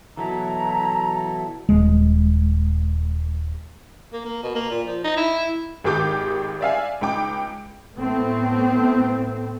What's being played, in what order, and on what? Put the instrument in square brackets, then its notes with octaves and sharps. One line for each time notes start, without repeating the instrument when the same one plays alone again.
[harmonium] B2 [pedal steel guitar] E3 F#3 E4 [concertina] A4 [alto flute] A#5
[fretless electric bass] D#1 G#3
[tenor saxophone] A#3
A#3
B2
A#3
A#2
F3
D#4
E4
[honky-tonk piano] G#1 D#3 G#3 G4 D6 G6
D5 E5 F5 G#5
C#2 D#4 G5 D6
[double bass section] A2 A3 B3 C4